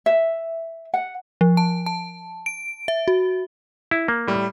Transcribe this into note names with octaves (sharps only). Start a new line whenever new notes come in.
E5
F#5
F3
A5
A5
D7
E5
F#4
E4
A#3
A2 G3